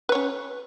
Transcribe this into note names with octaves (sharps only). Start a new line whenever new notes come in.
C#4 B4 C#5